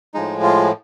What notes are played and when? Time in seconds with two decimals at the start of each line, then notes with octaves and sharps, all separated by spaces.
0.14 A2 F3 G#3 D#4
0.43 F4